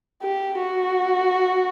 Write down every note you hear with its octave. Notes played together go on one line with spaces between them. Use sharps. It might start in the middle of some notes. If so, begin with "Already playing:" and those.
G4
F#4